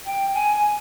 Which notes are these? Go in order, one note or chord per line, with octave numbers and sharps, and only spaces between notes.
G5
G#5